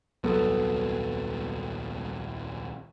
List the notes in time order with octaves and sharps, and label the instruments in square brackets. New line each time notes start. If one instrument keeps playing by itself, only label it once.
[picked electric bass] D#1 C2 F#3 [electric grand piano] B3 A4